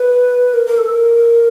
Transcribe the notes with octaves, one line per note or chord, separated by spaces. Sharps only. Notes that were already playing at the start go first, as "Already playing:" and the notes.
Already playing: B4
A#4
A#4
A4
A#4